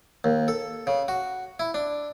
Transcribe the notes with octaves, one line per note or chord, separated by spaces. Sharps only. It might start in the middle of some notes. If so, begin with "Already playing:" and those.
D#2
A4
C#3
F#4
E4
D4